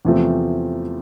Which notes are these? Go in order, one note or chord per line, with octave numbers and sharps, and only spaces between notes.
E2 C3 F3 A3 C4